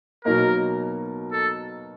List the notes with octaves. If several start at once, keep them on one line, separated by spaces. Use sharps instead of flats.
B2 F#3 A#3 D#4 A#4
A4